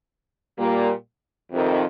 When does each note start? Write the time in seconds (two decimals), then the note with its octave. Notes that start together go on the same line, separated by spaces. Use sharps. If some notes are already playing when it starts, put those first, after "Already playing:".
0.58 A#2 G3 A#3
1.52 F2 C3 D#3